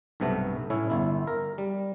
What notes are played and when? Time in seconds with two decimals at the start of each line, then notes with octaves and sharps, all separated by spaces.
0.20 B1 G2 C3 A3 B3
0.70 A2 C#4 E4
0.90 G1 E4
1.27 A#4
1.58 G3